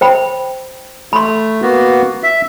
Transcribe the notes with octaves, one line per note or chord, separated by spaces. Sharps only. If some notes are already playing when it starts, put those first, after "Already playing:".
C5 G5 B5
A3 B5 C6
A#3 B3 F#4
E5